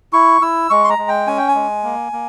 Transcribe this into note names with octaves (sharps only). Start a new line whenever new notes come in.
E4 C#6
E4 E6
G#3 C#6
C6
A#5
G#3
G5
C#4 G#5
G5
G#5
G#3
A#3
A#3